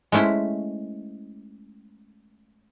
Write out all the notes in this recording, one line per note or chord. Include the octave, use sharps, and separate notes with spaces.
G#3 A3 C#4 E4 C5